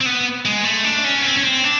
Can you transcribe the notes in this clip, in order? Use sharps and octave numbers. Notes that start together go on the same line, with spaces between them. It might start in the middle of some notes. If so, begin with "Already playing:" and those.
C4
B3
G#3
A3
D4
C#4
B3
C4
C#4
C4
D4